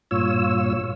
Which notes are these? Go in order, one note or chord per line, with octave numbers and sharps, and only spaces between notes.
G2 A#2 F4 C#5 E6